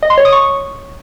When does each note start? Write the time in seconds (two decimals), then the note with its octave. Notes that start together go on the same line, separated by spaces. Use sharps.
0.03 D#5
0.10 C6
0.18 C#5
0.25 D#6
0.33 C#6